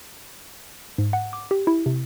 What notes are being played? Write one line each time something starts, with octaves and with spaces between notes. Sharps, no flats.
G#2
F#5
D6
G4
E4
C3